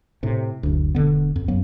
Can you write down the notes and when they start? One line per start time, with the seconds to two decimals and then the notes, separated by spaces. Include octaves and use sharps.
0.23 A2 C3
0.63 F#1 D2
0.95 E1 D3 B3
1.36 F2
1.48 F#2 F#3 A#3 B3